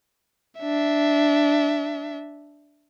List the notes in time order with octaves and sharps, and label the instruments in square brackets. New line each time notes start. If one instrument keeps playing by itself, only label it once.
[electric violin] D4 E5